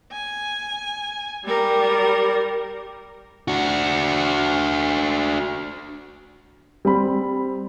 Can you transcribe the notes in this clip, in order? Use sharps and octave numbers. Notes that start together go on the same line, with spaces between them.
G#5
G3 A#4
D4 F#4
G3 C4 B5